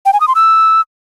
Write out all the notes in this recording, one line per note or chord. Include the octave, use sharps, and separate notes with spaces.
G5
G#5
D#6
C6
E6